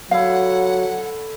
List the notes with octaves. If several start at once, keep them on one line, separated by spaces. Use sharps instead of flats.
D3 F#3 E4 F5 F#5